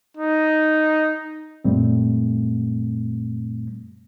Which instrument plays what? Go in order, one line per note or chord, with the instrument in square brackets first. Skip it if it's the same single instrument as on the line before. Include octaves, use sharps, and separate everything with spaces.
[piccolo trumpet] D#4
[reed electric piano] F#2 A#2 G3 A3 C4